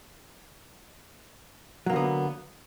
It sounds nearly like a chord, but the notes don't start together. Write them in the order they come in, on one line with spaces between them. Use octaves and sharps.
F#3 A#3 D3 B3